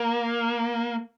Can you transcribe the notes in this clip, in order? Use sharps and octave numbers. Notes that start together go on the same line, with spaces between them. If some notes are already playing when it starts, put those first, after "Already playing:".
Already playing: A#3